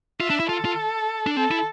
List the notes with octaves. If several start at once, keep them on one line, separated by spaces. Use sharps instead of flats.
F4 E5
D4
E4
F4 A4
F4
D4
C4 A4
E4